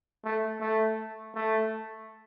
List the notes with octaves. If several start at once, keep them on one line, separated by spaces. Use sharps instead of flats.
A3
A3
A3